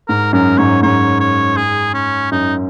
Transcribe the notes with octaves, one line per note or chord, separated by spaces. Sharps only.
G#2 A#4
F#2 A#4
G#2 C#5
G#2 C#5
C#5
G#4
C#4
F#2 D#4